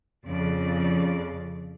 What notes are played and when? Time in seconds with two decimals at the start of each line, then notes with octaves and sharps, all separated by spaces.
0.24 F2 C#3 D5